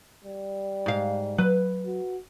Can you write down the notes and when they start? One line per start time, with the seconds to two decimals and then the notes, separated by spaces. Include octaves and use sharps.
0.24 G3
0.86 G#2 F5
1.38 F#3 B4
1.85 F#4